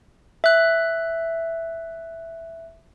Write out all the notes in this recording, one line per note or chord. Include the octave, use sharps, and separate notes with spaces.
E5 F#6